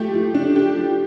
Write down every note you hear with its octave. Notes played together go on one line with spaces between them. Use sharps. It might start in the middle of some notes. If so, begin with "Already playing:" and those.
Already playing: F3 A3 G4
F3
D4
G4
F3